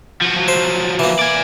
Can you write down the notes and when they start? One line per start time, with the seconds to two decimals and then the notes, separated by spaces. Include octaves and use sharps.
0.21 F3 F#4
0.36 F3 F#3
0.48 C5
0.99 E3 A#3
1.19 D5 G#5